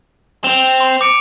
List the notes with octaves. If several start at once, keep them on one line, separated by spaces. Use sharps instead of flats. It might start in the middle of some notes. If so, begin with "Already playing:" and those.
C4 E7 F7
C6
D6 C#7 D7